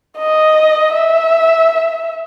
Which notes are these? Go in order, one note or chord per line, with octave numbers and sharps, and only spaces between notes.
D#5
E5